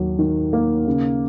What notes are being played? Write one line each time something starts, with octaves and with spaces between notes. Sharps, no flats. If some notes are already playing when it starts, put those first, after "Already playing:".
Already playing: D#2 F#3
D#3
A#3
C#3